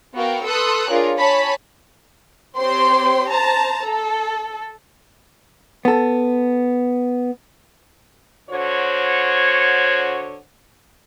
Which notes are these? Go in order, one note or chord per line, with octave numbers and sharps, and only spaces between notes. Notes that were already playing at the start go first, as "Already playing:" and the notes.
B3 F#4 A#4 F5 G5
A4 B4 C6 D#6 E6 F#6
D4 F4 G#4 A#4 C#5
C#5 G#5 A5 B5 B6
C4 G4 C5 C#5 G5 C6
C5 A5 A#5
A4
B3 A4
D3 F#4 C5 C#5